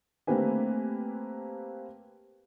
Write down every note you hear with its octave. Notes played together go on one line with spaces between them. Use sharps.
A3 A#3 C4 G4 B4 G#5